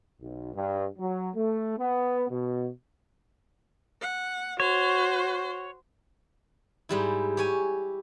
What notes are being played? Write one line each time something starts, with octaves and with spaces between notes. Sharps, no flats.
B1
G2
F#3
A3
B3
B2
F#5
F#4 C5 C#5
G#2 G3 E4
G4 C#5 G#5